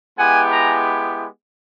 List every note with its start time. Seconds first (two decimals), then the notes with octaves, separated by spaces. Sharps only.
0.18 G#3 B3 E4 G4 F#5 G#5
0.52 G#5 A#5